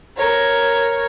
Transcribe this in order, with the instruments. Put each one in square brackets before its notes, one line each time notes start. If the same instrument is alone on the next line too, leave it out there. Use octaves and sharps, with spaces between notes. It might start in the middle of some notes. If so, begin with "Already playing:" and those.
[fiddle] A#4 C#5